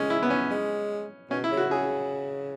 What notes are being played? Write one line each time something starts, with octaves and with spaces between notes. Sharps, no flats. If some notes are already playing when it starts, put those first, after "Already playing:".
Already playing: G#3 C#4
E4
B3
C#4
G#3
B2 C#4
E4
C#3
F#4
C#3 G#4